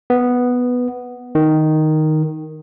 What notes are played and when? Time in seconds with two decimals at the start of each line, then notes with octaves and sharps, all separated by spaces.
0.10 B3
1.35 D#3